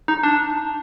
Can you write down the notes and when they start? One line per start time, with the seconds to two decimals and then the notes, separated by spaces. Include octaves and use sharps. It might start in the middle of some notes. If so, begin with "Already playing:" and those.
0.08 D#4
0.23 D4